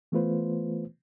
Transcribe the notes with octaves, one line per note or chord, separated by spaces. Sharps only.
E3 A3 B3 F4 B4 C5